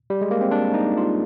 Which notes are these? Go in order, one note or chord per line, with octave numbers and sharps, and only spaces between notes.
G3
G#3
A#3
C4
D4
D#4
F4